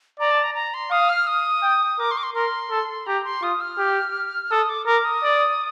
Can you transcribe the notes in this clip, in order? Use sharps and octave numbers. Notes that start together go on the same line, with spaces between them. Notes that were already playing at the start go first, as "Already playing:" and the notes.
D5 A#5
A5
A#5
A#5
C6
F5 D#6
F6
D#6
G5
A#4 D6
C6
D6
C6
A#4 C6
A4
G4 A#5
C6
F4 D#6
F6
G4
A4 D#6
D6
A#4 D6
D#6
D5